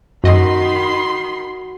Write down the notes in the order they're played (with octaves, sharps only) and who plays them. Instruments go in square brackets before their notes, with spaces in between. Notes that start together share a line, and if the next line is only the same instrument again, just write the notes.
[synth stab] F#2 D#5 [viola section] D#3 B5 C6 [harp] F#4